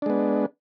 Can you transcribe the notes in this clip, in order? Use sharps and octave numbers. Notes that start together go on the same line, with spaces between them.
G#3 B3 D4